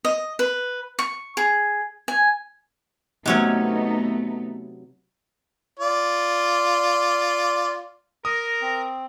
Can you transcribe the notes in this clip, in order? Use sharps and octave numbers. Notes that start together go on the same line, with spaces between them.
D#5
B4
C#6
G#4
G#5
C3 F#3 A3 B3 C#4 D#4
F4 D5
A#4 D#6 A#6
C4